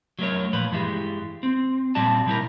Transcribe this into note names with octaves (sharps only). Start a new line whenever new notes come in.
F#3 A3 A#4 C#5
A#2 F3 B4
G2 E3 G3 G#3
C4
A#2 G3 C4 F#4 D5 A5
B2 G3 E4 A#4